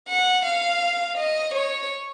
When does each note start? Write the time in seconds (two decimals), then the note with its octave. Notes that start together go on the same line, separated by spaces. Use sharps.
0.08 F#5
0.45 F5
1.17 D#5
1.54 C#5